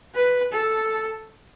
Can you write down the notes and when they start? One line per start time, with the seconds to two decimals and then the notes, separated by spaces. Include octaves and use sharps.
0.15 B4
0.53 A4